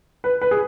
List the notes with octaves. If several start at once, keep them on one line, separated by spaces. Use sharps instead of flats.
B4
B4
G#4